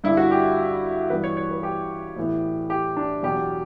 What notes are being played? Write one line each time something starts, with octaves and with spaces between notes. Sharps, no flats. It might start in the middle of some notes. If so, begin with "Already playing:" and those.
G2 D3 G3 E4
F#4
G4
G2 E3 G3 B3 B4
C#5
C#5
B4
G4
A2 E3 B3
G4
D4
E2 B2 F#3 G4